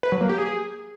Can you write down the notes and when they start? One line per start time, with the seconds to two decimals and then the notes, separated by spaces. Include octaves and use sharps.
0.03 B4
0.12 F#3
0.21 A#3
0.29 G4
0.38 G#4